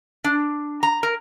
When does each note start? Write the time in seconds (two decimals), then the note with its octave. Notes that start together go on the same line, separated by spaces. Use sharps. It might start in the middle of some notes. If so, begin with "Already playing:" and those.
0.24 D4
0.83 A#5
1.03 A#4